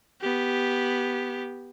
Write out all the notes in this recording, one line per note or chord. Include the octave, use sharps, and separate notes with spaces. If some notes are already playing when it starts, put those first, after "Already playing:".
B3 G4